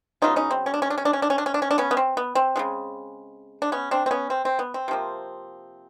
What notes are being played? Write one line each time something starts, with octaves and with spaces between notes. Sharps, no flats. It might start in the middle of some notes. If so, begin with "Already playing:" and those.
C#3 F#3 B3 D#4 F4
C#4 D#4
C4
C#4
D4
C#4
D4
C#4
D4
C#4
D4
C#4
D4
C#4
D4
C#4
D4
B3 C#4
B3
C4
B3
C4
C#3 F3 G#3
D4
B3 C#4
C4 D4
C4
B3 C#4
C4
C4
B3
C4
C3 F3 A#3